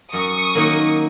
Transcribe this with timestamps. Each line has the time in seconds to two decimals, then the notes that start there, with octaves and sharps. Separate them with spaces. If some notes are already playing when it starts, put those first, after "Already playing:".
0.13 F#2 C#6 D#6
0.55 D#3 F#3 A#3